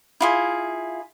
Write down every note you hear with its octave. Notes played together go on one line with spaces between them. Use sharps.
E4 F4 G#4